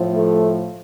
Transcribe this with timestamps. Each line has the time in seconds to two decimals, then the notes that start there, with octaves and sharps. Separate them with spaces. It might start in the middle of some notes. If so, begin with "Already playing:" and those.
Already playing: A2 F3
0.14 A3